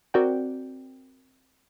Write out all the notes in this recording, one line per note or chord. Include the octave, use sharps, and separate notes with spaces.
C4 F#4 A#4 D5 F#5 G5